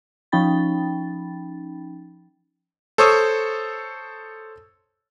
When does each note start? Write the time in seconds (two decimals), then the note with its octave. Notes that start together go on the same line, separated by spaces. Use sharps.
0.32 F3 C#4 D#4 G5 B5 A6
2.98 A4 C5 C#5 C#6 D#6 E6